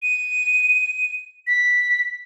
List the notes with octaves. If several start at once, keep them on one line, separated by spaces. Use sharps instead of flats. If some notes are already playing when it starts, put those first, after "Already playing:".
D#7
B6